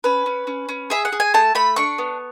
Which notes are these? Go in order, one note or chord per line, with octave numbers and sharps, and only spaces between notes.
C#4 B4
C#4
C#4
C#4
G#4 E5
F#5
G#4
G#5
A3 A5
A3 B5
D4 C#6
B3